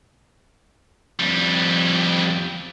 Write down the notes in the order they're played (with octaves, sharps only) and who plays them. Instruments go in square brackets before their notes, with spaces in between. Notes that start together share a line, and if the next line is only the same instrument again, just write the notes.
[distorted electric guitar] F2 G3